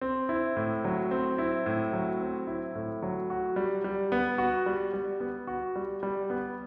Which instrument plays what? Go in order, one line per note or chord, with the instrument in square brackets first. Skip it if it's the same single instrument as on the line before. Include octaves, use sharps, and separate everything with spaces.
[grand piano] C4
E4
A2
F#3
C4
E4
A2
F#3
C4
E4
A2
F#3
F#4
G3
G3
B3
F#4
G3
G3
B3
F#4
G3
G3
B3